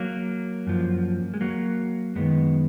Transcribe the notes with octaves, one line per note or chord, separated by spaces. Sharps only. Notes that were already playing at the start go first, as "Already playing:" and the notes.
Already playing: F#3 A#3
F#2 F3
G#3
F#3 A#3
F#2 D#3 G#3 B3